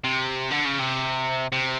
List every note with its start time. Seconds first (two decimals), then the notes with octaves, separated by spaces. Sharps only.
0.04 C3
0.50 D3
0.65 C#3
0.79 C3
1.52 C3